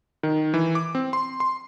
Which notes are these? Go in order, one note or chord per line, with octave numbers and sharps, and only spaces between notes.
D#3
E3
D6
C4
C6
C6